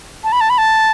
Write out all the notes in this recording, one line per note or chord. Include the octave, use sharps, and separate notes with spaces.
A5
B5
A5
B5
A5